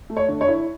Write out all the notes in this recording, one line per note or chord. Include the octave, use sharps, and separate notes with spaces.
A3
C#5
D3
C#5
E4